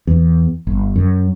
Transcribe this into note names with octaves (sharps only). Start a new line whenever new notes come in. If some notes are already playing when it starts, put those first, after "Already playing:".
E2
G1
F#2